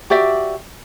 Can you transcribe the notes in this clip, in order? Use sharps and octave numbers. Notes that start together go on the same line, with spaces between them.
F#4 G4 D5 E5